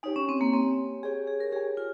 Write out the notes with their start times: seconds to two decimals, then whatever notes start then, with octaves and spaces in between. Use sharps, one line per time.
0.03 D#4 G4 C#5 G#5
0.16 C#4
0.29 C4
0.41 A#3
0.53 C4 G4 C#5 G#5
1.03 G4 G#4 C#5 G#5
1.27 G#4
1.40 A#4
1.52 G4 G#4 C#5 G#5
1.77 F4